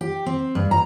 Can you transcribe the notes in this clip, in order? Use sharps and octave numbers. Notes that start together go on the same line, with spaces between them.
G4
C4
G2
A#5